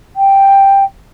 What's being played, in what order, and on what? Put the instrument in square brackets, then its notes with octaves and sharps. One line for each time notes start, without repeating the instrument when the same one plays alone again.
[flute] G5